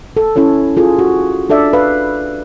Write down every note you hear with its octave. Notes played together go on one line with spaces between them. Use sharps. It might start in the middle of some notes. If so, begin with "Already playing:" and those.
A4
C#4 E4 A4 C#5
F4 G#4 A4
F#4
D4 A4 D5 E5
B4 F5